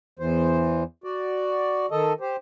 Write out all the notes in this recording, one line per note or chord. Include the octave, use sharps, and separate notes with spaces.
E2 E3 C5
F#4 D5
D#3 A4 D#5
G4 C5